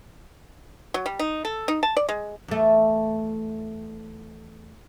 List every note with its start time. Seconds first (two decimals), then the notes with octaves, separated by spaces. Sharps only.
0.94 F#3
1.06 G3
1.19 D#4
1.45 A4
1.68 D#4
1.83 A5
1.97 D5
2.09 G#3
2.48 E2 A3